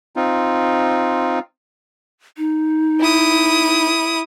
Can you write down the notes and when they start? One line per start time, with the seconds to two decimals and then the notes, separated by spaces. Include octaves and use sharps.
0.16 C4 D#4 F4
2.37 D#4
3.00 E4 D#6